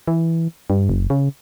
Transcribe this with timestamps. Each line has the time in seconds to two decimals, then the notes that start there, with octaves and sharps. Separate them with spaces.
0.08 E3
0.70 G2
0.89 F#1
1.10 C#3